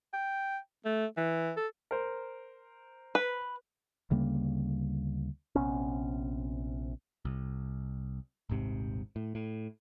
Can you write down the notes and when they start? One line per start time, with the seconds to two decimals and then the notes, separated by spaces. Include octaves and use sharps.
0.13 G5
0.85 A3
1.17 E3
1.57 A4
1.91 A#4 C5
3.15 B4
4.11 D2 C#3 G3 A#3
5.55 A#1 C3 B3 C#4
7.25 C2
8.50 D#1 G#1 G#2 C3
9.16 A2
9.35 A2